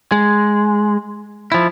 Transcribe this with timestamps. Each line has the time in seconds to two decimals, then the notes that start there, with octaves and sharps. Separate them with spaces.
0.12 G#3
1.52 F3 E4